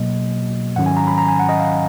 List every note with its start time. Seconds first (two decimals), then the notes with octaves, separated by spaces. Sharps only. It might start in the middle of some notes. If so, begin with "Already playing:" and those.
Already playing: B2 F#3 A#3 D#5
0.76 G#2 D#3 F#3 C#4 F#5
0.86 G#5
0.97 A#5
1.07 B5
1.18 A#5
1.28 G#5
1.39 F#5
1.49 D#5
1.60 F5